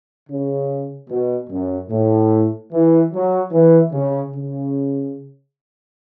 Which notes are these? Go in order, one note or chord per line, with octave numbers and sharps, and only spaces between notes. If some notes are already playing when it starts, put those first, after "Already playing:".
C#3
B2
F#2
A2
E3
F#3
E3
C#3
C#3